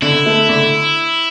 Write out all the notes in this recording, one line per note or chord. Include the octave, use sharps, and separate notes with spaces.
D3 E4
A3
D3